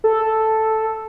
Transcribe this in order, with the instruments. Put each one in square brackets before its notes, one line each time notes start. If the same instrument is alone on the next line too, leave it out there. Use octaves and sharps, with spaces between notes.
[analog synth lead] A4